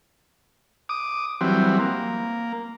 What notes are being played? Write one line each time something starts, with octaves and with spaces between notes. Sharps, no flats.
D6 D#6
E3 F#3 G3 C4
A#3